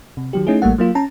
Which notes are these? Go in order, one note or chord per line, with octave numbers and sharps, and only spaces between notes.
C3
D#3 F#3 G4
A3 C#4 D#4 E4 G#4
A1 G3 A3 A#3 F#5
F#3 A#3 F4
C#4 A5 A#5